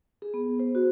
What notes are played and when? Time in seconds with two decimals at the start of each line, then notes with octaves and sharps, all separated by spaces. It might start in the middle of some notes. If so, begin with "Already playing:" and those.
0.22 G#4
0.34 B3
0.59 C5
0.75 F#4